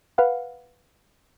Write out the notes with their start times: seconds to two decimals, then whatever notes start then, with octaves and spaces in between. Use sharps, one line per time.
0.18 B4 F5 F#5